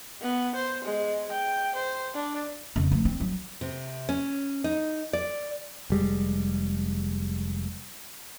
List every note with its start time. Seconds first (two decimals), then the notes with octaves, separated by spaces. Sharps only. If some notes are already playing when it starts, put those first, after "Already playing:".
0.22 B3
0.56 C5
0.85 G#3
1.32 G5
1.76 C5
2.14 D4
2.76 F2 C#3
2.92 F3 A3
3.05 C4
3.20 F#3
3.61 C3
4.09 C#4
4.64 D#4
5.13 D5
5.90 F1 G3 G#3